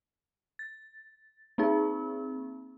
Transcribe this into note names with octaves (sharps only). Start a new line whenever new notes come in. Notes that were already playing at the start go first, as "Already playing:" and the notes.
A6
A#3 C4 D#4 G#4